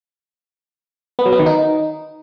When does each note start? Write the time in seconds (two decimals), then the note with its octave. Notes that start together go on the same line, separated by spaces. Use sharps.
1.19 B3
1.26 F#3
1.32 B3
1.39 D#3
1.46 D#4